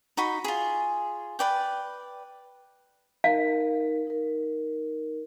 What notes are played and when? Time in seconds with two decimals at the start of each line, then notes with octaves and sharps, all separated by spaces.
0.17 D#4 F#4 B5
0.44 F4 G#4
1.39 B4 D5 G5
3.24 D#4 A#4 F5
4.07 D#4 A#4